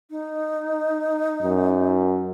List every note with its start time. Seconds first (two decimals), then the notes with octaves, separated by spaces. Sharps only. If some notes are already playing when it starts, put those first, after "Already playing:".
0.11 D#4
1.42 F#2